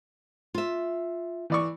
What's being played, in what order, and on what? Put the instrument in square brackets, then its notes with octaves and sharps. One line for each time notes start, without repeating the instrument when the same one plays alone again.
[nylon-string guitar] F4 E5
[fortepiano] E3 D5 C#6